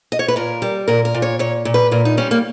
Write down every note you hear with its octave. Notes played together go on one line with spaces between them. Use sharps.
D#5
C#5
B4
A#2 A#4
G3
A#2 A#4
A#4
A#2
C#5
A#2 C#5
A#2
B4
A#2 A#4
D#4
G3 C#4
A#3